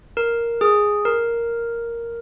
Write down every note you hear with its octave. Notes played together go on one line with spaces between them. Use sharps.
A#4
G#4
A#4